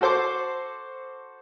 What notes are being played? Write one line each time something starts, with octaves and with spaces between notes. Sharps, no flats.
F#4 A4 C5 C6 D6